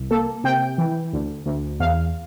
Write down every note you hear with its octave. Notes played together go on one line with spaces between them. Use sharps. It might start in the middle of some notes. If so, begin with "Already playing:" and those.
Already playing: C2
A#3 A4
C3 G5
E3
D2
D2
E2 F5